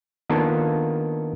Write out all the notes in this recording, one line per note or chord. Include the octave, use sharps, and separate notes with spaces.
D#3 A#3 B3 D4 F4 A4